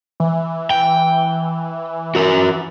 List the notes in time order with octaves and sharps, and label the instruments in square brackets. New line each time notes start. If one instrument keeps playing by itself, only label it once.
[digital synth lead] E3
[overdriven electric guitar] G5
F#4 A#4